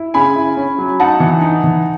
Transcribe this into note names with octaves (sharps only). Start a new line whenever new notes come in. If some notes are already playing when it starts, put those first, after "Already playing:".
Already playing: E4
C#3 G#5 B5
E4
C#4
F#3
D#4 F#5 A5
E3
D#4
E3